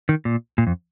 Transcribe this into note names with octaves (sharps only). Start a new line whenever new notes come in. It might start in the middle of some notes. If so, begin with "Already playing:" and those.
D#3
A#2
A#2
F2